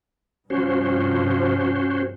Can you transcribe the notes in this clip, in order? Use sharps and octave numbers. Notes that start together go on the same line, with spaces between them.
G2 C3 F3 C#4 F#4 C5